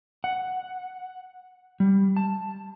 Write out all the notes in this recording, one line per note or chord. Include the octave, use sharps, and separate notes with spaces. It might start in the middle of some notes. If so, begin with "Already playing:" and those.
F#5
G3
A5